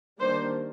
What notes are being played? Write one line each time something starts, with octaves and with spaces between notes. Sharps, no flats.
D#3 G3 A#3 D4 C5